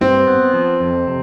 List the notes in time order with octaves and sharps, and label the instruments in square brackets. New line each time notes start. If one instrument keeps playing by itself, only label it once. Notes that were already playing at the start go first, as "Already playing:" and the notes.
[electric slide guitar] G2 [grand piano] C4
[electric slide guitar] B3
F3
F2
C3